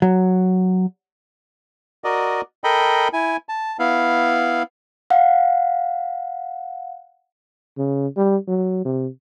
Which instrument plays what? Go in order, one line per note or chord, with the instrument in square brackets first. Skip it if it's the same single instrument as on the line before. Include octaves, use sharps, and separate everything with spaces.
[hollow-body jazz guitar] F#3
[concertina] F#4 A#4 D5 D#5
A4 A#4 D#5 G5 B5
E4 G#5
A5
B3 E4 F5
[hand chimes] F5 F#5
[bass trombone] C#3
G3
F#3
C3